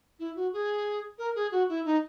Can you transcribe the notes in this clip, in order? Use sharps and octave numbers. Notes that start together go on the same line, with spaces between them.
E4
F#4
G#4
A#4
G#4
F#4
E4
D#4